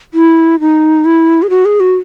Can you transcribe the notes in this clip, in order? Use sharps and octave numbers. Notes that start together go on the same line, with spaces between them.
E4
D#4
E4
G#4
F#4
G#4
F#4